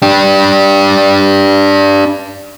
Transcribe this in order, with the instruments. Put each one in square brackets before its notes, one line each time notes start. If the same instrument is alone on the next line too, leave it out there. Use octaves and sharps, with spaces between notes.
[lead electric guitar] D4 G4